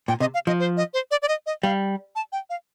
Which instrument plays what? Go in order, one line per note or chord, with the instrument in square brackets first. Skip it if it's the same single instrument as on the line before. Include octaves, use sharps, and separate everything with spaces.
[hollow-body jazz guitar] A#2 [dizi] G5
[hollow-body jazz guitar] C3 [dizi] D#5
[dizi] F5
[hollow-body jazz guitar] F3 [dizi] D#5
[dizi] C5
D#5
C5
D5
D5
D#5
D#5
[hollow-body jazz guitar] G3 [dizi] F5
[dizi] A5
G5
F5